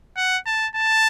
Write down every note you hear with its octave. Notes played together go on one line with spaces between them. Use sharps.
F#5
A5
A5